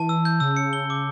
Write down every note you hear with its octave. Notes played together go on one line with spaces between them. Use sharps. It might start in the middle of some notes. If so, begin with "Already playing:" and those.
Already playing: E3 A5
E6
G6
C#3 E6
C#7
G7
D6